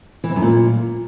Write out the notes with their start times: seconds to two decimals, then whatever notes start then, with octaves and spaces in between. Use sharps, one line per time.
0.24 E3
0.30 F2
0.36 F#2
0.42 A#2